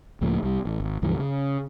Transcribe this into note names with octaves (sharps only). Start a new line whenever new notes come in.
C#2 A2 F3 A#3
C2 G3
A1
G#1
C#2 G2 E3 F3
C#3